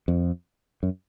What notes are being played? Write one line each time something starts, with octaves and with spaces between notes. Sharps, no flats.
F2
F#2